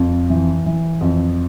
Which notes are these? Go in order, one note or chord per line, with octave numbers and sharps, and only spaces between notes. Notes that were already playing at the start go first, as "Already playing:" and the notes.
Already playing: F2
E3
E3
F2